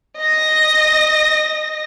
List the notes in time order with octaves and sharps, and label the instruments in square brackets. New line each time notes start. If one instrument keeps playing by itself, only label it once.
[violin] D#5 A#6